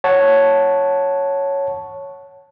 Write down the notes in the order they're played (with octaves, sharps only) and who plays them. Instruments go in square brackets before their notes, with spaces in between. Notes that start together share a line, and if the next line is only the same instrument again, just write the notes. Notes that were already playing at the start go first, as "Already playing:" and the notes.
[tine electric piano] C#5 F#5 A5